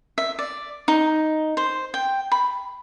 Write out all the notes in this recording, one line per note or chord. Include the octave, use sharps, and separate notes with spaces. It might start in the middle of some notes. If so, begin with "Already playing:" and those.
E5
D5
D#4
C5
G5
B5